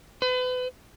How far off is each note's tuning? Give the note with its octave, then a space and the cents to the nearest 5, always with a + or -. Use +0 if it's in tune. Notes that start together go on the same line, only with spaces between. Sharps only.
B4 +35